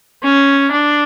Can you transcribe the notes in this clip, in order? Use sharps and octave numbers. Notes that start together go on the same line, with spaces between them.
C#4
D4